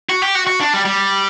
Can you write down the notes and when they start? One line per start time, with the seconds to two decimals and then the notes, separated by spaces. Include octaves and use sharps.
0.09 F#4
0.22 G4
0.35 F#4
0.47 F#4
0.60 D4
0.74 G3
0.85 G3